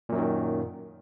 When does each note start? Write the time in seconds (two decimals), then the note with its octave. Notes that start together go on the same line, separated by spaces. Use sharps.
0.09 A#2
0.12 F#2
0.15 F#3
0.18 D#3